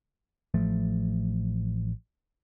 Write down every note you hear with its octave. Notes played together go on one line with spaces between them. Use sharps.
A1 F3 A3